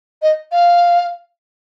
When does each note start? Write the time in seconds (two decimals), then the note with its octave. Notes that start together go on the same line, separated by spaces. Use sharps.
0.22 D#5
0.52 F5